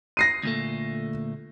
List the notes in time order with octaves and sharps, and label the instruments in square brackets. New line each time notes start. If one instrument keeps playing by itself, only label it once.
[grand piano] A#6 C7 D#7
[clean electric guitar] D2 A#2 A3